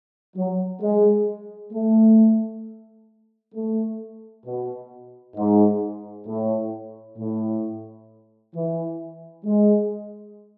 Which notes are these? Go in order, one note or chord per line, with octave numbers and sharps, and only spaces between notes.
F#3
G#3
A3
A3
B2
G#2
A2
A2
E3
G#3